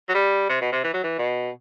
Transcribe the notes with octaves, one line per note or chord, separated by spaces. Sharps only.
F#3
G3
C3
B2
C3
E3
F#3
E3
B2